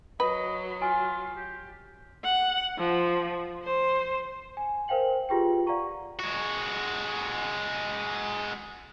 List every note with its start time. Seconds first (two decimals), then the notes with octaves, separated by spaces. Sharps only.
0.20 F#3 B4 D#5
0.82 F4 G#5
1.36 G4
2.25 F#5
2.78 F3
3.63 C5
4.57 G#5
4.88 A#4 C5 F5 G5 F#7
5.29 F4 G4 G#4 B4 G5
5.67 D5 F5 F#5 A#5 C#6
6.19 G#3 F#4